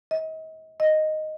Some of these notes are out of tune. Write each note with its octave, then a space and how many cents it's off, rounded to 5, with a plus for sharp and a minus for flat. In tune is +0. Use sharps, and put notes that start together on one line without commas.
D#5 +35
D#5 -5